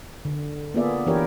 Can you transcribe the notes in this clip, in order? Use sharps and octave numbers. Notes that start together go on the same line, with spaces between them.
D3
A#3 B3 F4 G#4 D5 E5
E3 D4 E4 G4 A#4 C#5